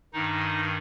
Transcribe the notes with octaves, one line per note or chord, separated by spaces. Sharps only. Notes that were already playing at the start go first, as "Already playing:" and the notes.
G2 D#3 D#4